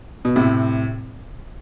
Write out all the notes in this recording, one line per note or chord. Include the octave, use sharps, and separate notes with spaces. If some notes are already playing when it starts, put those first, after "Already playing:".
B2
A2 C3